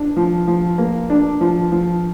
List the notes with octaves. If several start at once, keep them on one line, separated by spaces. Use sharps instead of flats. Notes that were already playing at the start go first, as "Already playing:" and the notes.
Already playing: D4
F3
F3
A#3
D4
F3
F3